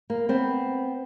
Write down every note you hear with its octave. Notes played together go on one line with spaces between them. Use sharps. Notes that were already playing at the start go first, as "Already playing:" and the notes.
A#3
B3 C4